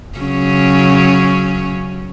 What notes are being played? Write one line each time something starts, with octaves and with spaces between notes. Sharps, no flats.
C#3 F#3 C#4